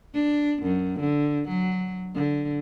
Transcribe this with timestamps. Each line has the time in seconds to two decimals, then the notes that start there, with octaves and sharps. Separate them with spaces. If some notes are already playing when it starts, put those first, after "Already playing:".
0.14 D4
0.62 F#2
1.00 D3
1.48 F#3
2.15 D3